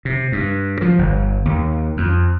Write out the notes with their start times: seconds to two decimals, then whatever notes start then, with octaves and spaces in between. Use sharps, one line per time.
0.05 C3
0.32 G2
0.82 F3
0.99 G1
1.45 D#2
1.97 F2